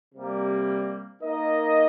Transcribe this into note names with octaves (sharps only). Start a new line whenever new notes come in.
C3 G3 A#3
A#3 D#4 A#4 D#5